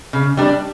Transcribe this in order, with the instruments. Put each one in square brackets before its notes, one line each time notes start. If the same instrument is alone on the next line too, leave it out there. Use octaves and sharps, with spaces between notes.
[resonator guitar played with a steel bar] C#3
G3 D4